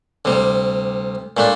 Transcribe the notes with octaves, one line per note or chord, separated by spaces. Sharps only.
D2 C3 G3
A#2 A3 D4